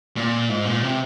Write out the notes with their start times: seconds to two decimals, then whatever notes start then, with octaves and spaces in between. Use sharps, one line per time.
0.16 A#2
0.49 G#2
0.65 A#2
0.82 C3